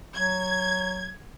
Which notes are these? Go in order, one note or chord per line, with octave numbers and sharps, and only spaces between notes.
F#3 G#6